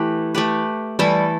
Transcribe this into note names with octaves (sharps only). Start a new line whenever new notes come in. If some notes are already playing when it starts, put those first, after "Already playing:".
Already playing: E3 A3 G4 B4
A3 G4 B4
E3 G3 A3 E4 A4